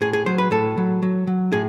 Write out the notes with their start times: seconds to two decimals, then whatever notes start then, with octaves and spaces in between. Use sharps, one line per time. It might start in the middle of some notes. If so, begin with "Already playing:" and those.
0.01 A2 G#4
0.13 G#4
0.26 F#3 C5
0.38 B4
0.51 A2 A4
0.78 F#3
1.02 F#3
1.27 F#3
1.52 A2 G#4